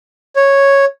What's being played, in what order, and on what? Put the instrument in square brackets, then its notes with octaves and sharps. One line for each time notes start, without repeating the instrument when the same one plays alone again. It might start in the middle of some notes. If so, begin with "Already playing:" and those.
[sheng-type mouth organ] C#5